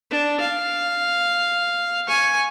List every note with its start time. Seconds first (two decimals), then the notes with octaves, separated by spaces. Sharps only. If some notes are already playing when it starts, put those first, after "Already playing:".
0.11 D4
0.40 F5
2.07 G#5 C#6